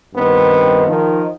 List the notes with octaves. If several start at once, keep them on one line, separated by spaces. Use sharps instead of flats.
G2 D#3 B3 C4
D#3 F3